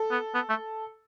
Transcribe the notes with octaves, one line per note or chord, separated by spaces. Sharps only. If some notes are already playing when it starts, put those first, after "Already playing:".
Already playing: A4
B3
B3
A3